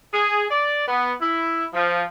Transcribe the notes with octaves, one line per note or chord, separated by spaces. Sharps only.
G#4
D5
B3
E4
F3